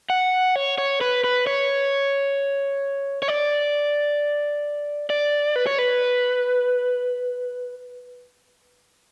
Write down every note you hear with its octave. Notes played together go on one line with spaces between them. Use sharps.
F#5
C#5
C#5
B4
B4
C#5
C#5
D5
D5
B4
C#5
B4